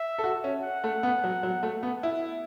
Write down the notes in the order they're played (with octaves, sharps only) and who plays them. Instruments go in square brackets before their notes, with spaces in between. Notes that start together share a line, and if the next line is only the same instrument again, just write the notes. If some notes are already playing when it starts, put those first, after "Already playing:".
Already playing: [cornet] E5
[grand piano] A4
F#4
C#4
[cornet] F#5
[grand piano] A3
B3
F#3
F#3
A3
B3
E4